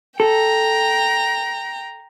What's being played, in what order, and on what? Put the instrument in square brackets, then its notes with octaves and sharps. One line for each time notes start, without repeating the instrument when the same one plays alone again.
[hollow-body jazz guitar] A4 [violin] G5 A#5